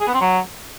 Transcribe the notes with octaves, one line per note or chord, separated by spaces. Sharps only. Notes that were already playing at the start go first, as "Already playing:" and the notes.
G#4
B3
C4
F#3